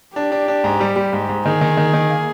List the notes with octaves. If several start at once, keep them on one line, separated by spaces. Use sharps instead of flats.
D4 G4
D4
D4
G#2
G3
G3
G#2
G#2
D#3 G#4
D#3
D#3
D#3
A#3